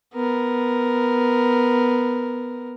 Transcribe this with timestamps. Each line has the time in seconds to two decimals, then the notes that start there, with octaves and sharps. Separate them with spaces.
0.14 B3 A#4